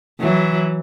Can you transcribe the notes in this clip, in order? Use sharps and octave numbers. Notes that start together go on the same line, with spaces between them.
E3 F#3